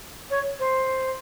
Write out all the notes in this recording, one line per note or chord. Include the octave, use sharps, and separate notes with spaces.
C#5
C5